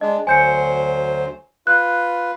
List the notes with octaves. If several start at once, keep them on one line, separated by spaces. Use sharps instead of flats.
G#3 D4 D#5
D2 F#3 C5 G#5 G6 C#7
F4 B4 F#6